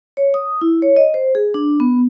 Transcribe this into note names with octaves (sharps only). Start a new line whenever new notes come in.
C#5
D#6
E4
C#5
D#5
C5
G#4
D4
B3